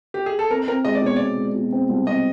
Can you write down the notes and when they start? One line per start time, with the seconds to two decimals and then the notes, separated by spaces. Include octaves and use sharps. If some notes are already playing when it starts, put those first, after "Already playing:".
0.14 G4
0.26 G#4
0.39 A4
0.51 C4 A#4
0.68 C4 A#4
0.85 G#3 D#5
0.95 D5
1.02 B2 C#5
1.16 B2 D5
1.37 G#3
1.55 B2
1.72 C4
1.89 C2
2.07 C4 D#5